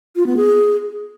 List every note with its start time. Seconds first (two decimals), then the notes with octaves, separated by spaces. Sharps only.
0.16 F4
0.26 B3
0.37 G#4